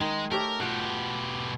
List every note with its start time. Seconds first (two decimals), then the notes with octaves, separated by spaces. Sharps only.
0.01 D#3 G#3
0.31 A3 G4 A#4 C#5
0.60 B2 F4 G4 F#5